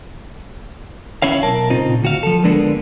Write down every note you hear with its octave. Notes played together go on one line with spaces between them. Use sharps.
C#4 E4 C#5 F5
B1 A#4 A5
A#2 C#3 C4 D#4 F4
D2 F#4 F5
F3 A4
D3 G#3 A#3 B3 D4